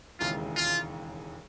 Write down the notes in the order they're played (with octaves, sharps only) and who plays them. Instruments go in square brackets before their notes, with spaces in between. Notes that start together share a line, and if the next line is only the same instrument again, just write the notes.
[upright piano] E1 D#2 C#3 E3 G#3 [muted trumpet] F4
[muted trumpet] F4